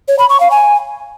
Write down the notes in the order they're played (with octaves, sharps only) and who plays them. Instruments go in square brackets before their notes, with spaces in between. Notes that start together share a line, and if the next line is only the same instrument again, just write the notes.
[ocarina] C#5
B5
C#6
F5
G#5